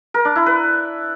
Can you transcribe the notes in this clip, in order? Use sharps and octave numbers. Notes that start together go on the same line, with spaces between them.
A#4
D4
E4
B4